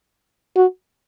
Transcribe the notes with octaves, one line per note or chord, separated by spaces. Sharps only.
F#4